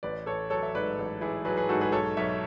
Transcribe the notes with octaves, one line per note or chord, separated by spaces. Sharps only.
A1 B4 D5
A1 A4 C#5
F#3 A4 C#5
C#5 E5
G#2 B4 D5
A1
A1 E4 G#4
F#3 G#4 B4
G#4 B4
G#2 F#4 A4
G#4 B4
B1 A4 C#5
B1 C#5 E5